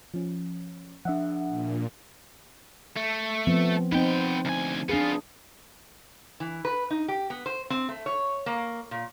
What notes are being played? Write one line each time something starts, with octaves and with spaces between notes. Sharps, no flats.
F3 C#4
F3 D4 E5 F#5
A#2
A3
F3 B3 C4
B3 C4 D#4 G5
D2 G#5
B3 D4 F4 G#4
E3
B4
D#4
G4
B3
C5
C4
A3
C#5
A#3
A#2